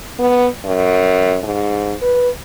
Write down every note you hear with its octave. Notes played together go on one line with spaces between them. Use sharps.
B3
F#2
G#2
B4